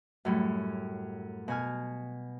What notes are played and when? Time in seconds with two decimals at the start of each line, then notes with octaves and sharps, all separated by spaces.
0.25 F#2 A2 G3
1.48 B2 G#5 F6